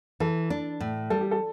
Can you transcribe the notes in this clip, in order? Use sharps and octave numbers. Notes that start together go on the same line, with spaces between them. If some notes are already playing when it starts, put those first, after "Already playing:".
E3 A4
D4
A2
G3 A4
G4
A4